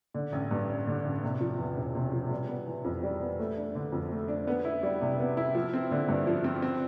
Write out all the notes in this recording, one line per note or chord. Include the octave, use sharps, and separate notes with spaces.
D3
A1
G2
A1
D3
A1
C3
F3
E2
E1
C3
F3
G3
B3
E3
F2
G3
B3
A3
D4
D3
F2
A3
D4
B3
E4
G3
C3
B3
E4
F3
C4
D3
G2
F3
C4
C4